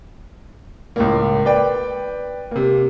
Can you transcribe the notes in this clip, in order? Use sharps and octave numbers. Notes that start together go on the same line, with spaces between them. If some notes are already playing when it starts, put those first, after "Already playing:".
C#2 A2 A#3
B4 D5 G5
C3 A#3